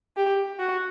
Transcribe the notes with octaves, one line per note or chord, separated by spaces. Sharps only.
G4
F#4